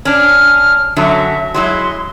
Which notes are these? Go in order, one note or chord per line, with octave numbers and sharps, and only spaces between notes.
C#4 D4 F6
F#2 D3 F#3 E5
F#3 G#3 E4 C6